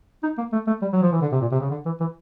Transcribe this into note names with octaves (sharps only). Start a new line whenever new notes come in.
D#4
A#3
A3
A3
G3
F#3
F3
E3
D3
C3
A#2
C3
C#3
D3
E3
E3